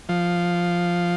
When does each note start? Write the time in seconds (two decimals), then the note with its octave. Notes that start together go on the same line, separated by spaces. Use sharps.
0.09 F3